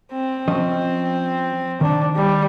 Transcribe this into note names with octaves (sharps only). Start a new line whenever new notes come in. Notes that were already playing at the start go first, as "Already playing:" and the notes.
C4
F3 C#4 D#5
D#3 D4
G3